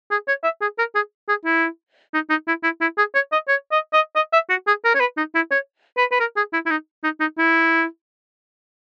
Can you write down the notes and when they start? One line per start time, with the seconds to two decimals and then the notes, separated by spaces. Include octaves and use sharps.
0.11 G#4
0.28 C#5
0.44 E5
0.61 G#4
0.78 A#4
0.95 G#4
1.29 G#4
1.45 E4
2.14 D#4
2.30 D#4
2.48 E4
2.64 E4
2.81 E4
2.98 G#4
3.15 C#5
3.32 D#5
3.48 C#5
3.72 D#5
3.93 D#5
4.16 D#5
4.33 E5
4.50 F#4
4.67 G#4
4.85 A#4
4.95 C#5
5.00 B4
5.17 D#4
5.35 E4
5.51 C#5
5.97 B4
6.12 B4
6.20 A#4
6.37 G#4
6.53 E4
6.66 E4
6.70 D#4
7.04 D#4
7.20 D#4
7.38 E4